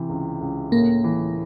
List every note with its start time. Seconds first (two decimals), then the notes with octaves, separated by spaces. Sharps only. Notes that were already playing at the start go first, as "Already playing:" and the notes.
Already playing: C3 E3
0.09 C#2
0.41 C#2
0.72 A2 A#3
1.04 E3